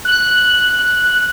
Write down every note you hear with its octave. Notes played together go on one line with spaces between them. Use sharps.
F#6